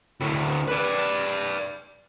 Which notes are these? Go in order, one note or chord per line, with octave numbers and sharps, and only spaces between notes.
D2 A2
B4 D5